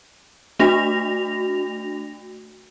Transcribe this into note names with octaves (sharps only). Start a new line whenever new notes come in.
A3 D4 F#4 A#6 F7